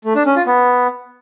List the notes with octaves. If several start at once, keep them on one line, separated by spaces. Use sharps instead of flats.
A3
D4
C#4
F4
B3